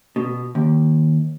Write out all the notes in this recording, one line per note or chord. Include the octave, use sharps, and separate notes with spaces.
B2
D#2